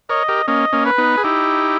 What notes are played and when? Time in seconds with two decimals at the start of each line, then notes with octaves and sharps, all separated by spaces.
0.09 A#4 C#5 D#5
0.28 G4 A#4
0.48 A#3 C#4 D#5
0.73 A#3 C#4
0.85 B4
0.98 B3 D#4
1.17 G#4
1.23 D#4 E4 G4